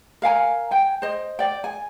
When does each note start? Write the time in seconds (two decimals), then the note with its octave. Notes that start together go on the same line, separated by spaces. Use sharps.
0.22 A#4 F5 G#5 A#5
0.71 G5 G#5
1.02 C5 D#5
1.39 D5 G5
1.64 G#5